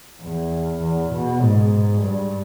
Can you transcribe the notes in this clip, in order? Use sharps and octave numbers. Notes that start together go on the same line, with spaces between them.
E2
E2
B2
G#2
G2